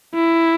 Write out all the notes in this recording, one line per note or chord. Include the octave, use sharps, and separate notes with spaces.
E4